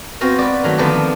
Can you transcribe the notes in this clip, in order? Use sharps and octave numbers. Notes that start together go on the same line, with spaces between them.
B3 C4 F#4 C5 D#5 F5
B4 D5
D#3 F#3 A3
D3 D#3 F3 B3 C4 D4